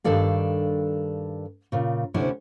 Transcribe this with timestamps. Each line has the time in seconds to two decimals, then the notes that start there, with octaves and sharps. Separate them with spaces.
0.04 G2 D#3 D4 A4 D5 F5
1.72 A#2 C#3
2.14 D2 C3 C#4 D4 E4 C#5